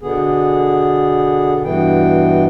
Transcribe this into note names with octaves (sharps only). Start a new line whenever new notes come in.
B2 D3 B3 G#4
G2 B2 E3 B3 G5